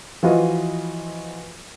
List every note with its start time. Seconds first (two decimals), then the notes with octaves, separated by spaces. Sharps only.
0.23 E3 F3 F4 F#4 B4 D#5